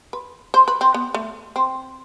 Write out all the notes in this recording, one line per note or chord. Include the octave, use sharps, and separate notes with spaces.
B4
C5
B4
C4
B3
A3
C4